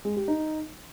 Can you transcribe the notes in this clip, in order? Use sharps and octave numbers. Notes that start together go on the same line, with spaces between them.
G#3
G4
D#4